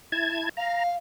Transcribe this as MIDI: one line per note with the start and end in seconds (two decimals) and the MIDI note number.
0.12 0.49 64
0.12 0.49 81
0.12 0.49 92
0.57 0.94 77
0.57 0.83 82